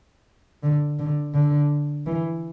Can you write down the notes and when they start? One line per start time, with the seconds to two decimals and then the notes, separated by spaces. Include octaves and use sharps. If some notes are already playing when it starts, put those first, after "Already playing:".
0.63 D3
0.99 D3
1.34 D3
2.06 E3